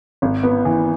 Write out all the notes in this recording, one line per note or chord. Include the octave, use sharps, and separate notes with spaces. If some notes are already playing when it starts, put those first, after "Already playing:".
G#1
B3
E3